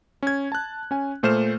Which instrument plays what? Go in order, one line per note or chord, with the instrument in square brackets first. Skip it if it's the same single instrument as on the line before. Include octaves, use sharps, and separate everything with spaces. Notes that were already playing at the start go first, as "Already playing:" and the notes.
[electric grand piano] C#4 G#6
A5 F#6
C#4 G#5
A#2 A3 C5 F6 E7